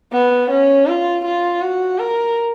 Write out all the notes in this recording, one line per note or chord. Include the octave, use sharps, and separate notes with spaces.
B3
C#4
F4
F4
F#4
A#4